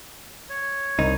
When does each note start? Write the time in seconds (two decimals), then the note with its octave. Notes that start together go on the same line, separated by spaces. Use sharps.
0.49 C#5
0.99 C2 D#4